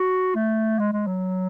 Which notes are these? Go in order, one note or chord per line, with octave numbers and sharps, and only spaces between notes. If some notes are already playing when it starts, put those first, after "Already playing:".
Already playing: F#4
A3
G#3
G#3
F#3